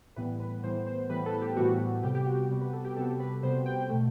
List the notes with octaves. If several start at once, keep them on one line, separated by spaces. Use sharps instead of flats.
A2 E3 G3 B3 B4
B4
A2 E3 G3 B3 C5
C5
A2 E3 G3 B3 B4
A4
G4
A2 E3 G3 B3 F#4
C3 G3 B3 G4
G4
F#4
G4
C3 G3 B3 G4
B4
A4
G4
C3 G3 B3 A4
B4
C3 G3 B3 C5
G5
B2 A3